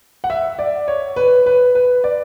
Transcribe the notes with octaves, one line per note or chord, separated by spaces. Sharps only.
F#5
E5
D5
C#5
B4
B4
B4
D5